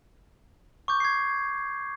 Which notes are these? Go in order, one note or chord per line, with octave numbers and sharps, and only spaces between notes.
C#6 D6 G6
G#6 C7